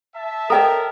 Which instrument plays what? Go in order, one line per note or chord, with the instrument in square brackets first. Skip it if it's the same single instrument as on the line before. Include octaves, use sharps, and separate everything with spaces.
[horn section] E5 A5
[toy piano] A4 D#5 [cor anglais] A#4 [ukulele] C#5 G5 A#5